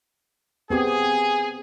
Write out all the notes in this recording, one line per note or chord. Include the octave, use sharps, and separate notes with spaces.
B3 C4 G4 G#4